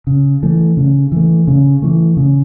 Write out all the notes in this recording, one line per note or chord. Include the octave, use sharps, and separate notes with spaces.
C#3
E3 A3
C#3
E3 A3
C#3
E3 A3
C#3